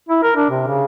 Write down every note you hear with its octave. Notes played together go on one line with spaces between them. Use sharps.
E4
A#4
D4
C3
C#3